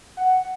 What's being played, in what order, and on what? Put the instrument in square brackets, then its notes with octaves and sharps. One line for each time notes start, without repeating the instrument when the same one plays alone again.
[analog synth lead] F#5